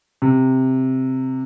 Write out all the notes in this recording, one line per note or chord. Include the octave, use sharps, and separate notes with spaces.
C3